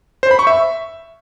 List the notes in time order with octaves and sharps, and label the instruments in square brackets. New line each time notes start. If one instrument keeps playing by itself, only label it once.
[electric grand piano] C5
B5
C#6
E5